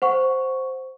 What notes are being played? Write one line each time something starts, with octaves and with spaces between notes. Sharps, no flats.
C5 F#5 C#6